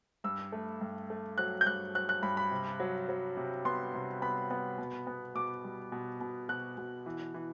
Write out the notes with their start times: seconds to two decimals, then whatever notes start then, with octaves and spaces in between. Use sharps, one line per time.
0.24 G2 E6
0.52 A3
0.81 G2
1.10 A3
1.38 F#3 F#6
1.61 G6
1.66 G2 F#6
1.95 F#3 F#6
2.09 F#6
2.22 G2 B5
2.37 B5
2.52 C3
2.80 F#3
3.09 F#3
3.37 C3
3.65 B3 C6
3.94 C3
4.22 B3 B5
4.51 B3
4.78 B2
5.07 B3
5.35 B2 D6
5.64 G3
5.92 B2
6.21 B2
6.49 B2 F#6
6.78 B2
7.06 E3
7.34 E3